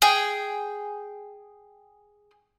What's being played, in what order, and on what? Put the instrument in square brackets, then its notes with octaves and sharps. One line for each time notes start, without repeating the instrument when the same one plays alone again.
[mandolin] G#4 G5